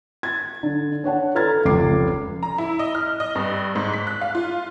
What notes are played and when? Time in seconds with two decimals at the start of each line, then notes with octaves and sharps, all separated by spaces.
0.23 G#6 A6
0.63 D3
1.04 D4 C#5 F#5 A5
1.35 A4 B4 A#5 F6 G#6 A6
1.65 F1 C#2 A4 D6 C7
2.43 A#5
2.58 E4
2.79 D#5
2.95 F6
3.20 D#5
3.35 G2
3.75 G#2
3.93 B6
4.07 F#6
4.21 F5
4.35 F4